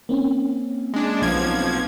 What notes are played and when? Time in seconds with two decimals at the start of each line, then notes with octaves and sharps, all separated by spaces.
0.09 A#3 C4 C#4
0.94 G#3 D4
1.22 B1 F3 G#6